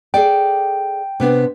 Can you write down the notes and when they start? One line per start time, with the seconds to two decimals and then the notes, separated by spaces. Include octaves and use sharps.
0.14 G#4 A4 D5 G5
1.20 C3 B3 D4